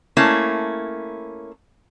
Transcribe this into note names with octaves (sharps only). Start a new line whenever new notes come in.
A3 A#3 C#4 E4